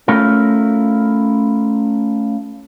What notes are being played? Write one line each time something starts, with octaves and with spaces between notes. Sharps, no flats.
A3 C#4 E4 F4 A#4